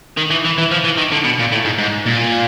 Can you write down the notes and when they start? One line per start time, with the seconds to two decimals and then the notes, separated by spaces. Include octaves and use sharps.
0.17 D#3
0.30 E3
0.45 E3
0.58 E3
0.71 F3
0.84 E3
0.98 D#3
1.12 D3
1.25 B2
1.39 A#2
1.52 A2
1.65 G#2
1.79 G#2
2.06 A#2